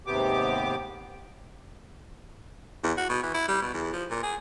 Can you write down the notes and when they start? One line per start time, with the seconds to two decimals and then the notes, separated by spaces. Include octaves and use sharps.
0.07 D#2 G#2 C3 B3 G4 D6
2.84 E2
2.97 F#4
3.09 B2
3.23 E3
3.34 E4
3.48 G3
3.62 B2
3.73 E2
3.93 F3
4.10 A#2
4.23 G#4